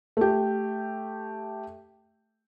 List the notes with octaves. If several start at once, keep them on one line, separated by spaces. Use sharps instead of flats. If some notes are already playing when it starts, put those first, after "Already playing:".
A3 G4